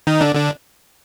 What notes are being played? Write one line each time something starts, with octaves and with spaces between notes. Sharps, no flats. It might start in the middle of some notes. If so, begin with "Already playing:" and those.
D#3 D#4
D3 D4
D3 D4